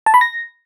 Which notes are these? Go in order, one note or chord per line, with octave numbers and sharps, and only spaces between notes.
A5
B5
A#6